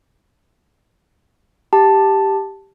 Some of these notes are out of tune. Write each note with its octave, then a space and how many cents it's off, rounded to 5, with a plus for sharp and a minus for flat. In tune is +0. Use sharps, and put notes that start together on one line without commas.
G4 +0 A5 +0